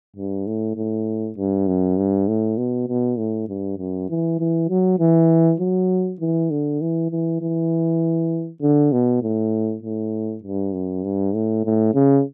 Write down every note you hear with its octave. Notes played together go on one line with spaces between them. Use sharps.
G2
A2
A2
G2
F#2
G2
A2
B2
B2
A2
G2
F#2
E3
E3
F#3
E3
F#3
E3
D3
E3
E3
E3
D3
B2
A2
A2
G2
F#2
G2
A2
A2
C#3